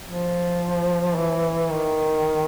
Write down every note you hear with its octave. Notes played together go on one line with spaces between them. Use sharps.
F3
E3
D#3